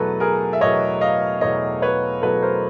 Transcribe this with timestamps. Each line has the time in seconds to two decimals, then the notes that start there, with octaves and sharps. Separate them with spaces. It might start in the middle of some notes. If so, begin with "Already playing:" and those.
Already playing: E2 B2 F#3 A3 A4 B4
0.20 G#4 A#4
0.53 E5
0.61 E2 B2 F#3 A3 C#5 D#5
1.01 D#5 F5
1.41 E2 B2 F#3 A3 C#5 D#5
1.82 B4 C#5
2.22 E2 B2 F#3 A3 A4 B4
2.42 A#4 C5